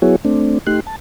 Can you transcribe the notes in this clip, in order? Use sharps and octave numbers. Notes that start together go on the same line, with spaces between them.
F#3 B3 E4 F#4 G#4 C#5
A3 C4 D4
A3 D#4 G4 C6 F#6
A5